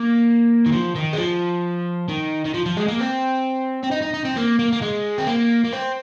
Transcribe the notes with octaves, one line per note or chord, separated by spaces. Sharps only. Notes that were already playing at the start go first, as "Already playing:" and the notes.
Already playing: A#3
D#3
F3
D#3
G#3
F3
D#3
D#3
F3
F3
G#3
A#3
C4
C4
D#4
D#4
D#4
C4
A#3
A#3
A#3
G#3
C4
A#3
A#3
C4